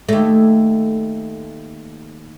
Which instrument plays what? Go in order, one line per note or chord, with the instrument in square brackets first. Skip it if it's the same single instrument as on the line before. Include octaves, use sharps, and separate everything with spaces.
[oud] D#2 A3